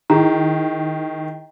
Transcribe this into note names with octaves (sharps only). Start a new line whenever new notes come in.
D#3 E4 G#4 A#5